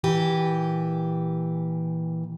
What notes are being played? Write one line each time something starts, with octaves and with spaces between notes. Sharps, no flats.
A#2 E3 G4